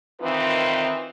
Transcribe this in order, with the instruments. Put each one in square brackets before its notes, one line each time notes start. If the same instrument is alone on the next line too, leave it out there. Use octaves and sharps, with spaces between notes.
[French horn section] D#3 E3 C4 D#4 F4 B4